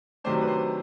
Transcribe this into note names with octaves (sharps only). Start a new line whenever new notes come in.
C3 D#3 F#3 A3 D4 C5
B4
C5